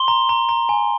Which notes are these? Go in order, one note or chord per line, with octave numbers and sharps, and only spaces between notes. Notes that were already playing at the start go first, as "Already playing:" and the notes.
Already playing: C6 G7
A#5
A#5
A#5
G#5